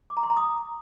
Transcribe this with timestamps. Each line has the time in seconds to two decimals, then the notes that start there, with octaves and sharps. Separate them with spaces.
0.10 D6
0.17 A#5
0.23 C6
0.30 A#5
0.37 D#6